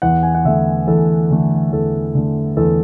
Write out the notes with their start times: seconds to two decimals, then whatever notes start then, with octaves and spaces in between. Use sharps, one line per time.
0.02 E2 F#5
0.23 G#5
0.34 F#5
0.45 D3 A3 E5
0.87 E2 A4
1.30 D3 A3
1.72 E2 A4
2.15 D3 A3
2.57 E2 A4